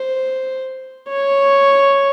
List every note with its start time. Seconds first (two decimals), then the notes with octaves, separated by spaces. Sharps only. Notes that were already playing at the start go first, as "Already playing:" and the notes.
Already playing: C5
1.09 C#5